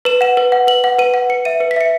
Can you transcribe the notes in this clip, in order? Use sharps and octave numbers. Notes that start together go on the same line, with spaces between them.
B4 E7
F#5 E7
B4
F#5
B4 F#7
F#5
B4 D#7
F#5
B4 C#7
E5 D#7
B4 C#7
B6
E5 C#7